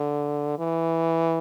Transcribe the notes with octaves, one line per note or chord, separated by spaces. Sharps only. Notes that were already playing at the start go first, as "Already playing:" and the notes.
Already playing: D3
E3